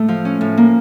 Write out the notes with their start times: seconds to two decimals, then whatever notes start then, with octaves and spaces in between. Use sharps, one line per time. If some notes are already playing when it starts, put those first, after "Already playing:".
Already playing: A2 A3
0.08 F3
0.25 C#4
0.41 A2
0.57 A#3